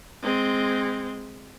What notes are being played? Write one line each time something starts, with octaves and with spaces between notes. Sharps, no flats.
G#3 C4